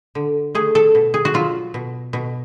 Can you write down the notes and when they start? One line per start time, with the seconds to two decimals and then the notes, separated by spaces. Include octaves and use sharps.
0.15 D3
0.55 A3 G#4
0.75 A4
0.95 B2
1.14 G#4
1.25 F#4
1.34 F#3 F4
1.74 B2
2.13 B2